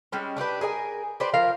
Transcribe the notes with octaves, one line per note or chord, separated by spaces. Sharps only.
G3 G#3 C#4
A3 D4 G4 B4
G#4 A#4 D5 G#5
G4 B4 C5 D5
F3 A#4 F5